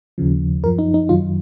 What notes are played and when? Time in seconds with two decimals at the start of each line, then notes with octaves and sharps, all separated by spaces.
0.18 D#2 C#3 F3
0.63 F#2 F3 A#4
0.79 D#4
0.94 D#4
1.09 F#2 D#3 F#3 F4